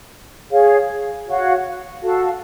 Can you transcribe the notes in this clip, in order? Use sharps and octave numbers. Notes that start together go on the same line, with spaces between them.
G#4 C#5 F5
F#4 C#5 F5
F#4 A4 F5 A5